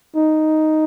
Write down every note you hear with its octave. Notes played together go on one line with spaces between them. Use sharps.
D#4